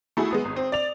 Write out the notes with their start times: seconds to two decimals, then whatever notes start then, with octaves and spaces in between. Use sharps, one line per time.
0.17 A3 E4 F#4 G#4
0.31 G#3 B3 D#6
0.45 G#1
0.56 C4
0.72 D5 F7